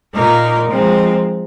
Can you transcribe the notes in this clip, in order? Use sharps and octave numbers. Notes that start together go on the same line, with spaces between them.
A#2 A#3 D#4 A#4
F3 G#3 C4 D#4